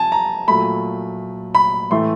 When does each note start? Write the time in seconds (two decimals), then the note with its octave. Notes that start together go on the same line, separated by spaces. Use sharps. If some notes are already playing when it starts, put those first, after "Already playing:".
Already playing: C3 F3 G#5 A5
0.12 A#5
0.47 A#2 F#3 A3 B5
1.55 B5
1.91 A2 E3 A3 C6